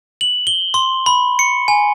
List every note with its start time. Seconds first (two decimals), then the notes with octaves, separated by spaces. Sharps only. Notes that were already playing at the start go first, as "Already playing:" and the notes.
0.21 F#7
0.47 G7
0.74 C6
1.06 B5
1.39 C#7
1.68 G#5